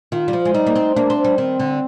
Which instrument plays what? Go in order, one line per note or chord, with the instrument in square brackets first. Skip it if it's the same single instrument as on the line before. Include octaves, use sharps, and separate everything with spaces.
[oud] D#3 [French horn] F4
[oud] G3
F3
G#3
[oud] G3 [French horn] D#4
[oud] A#3
C4
[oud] A#3 [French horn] D4
[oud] C4
G3
[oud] D#3 [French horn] C4
[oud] D3